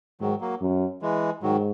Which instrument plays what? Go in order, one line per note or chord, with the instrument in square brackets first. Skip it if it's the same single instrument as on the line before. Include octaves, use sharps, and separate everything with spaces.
[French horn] G#2 [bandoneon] D#3 F#3
[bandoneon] F#3 A#3
[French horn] F#2
[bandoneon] E3 G#3
[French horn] G#2 [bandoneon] D#3 F#3